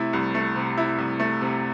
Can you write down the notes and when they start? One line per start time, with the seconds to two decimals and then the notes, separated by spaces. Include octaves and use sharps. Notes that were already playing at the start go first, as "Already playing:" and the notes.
Already playing: C3 A3 E4
0.13 C2
0.35 A3
0.56 C3
0.78 E4
0.98 C2
1.20 A3
1.41 C3